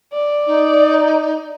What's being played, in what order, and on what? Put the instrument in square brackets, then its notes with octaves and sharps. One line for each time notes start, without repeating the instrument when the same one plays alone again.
[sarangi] D5
[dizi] D#4